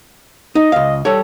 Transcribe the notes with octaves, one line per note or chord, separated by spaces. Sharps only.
D#4 D#5
C#2 F5
G3 G4 A4 C#5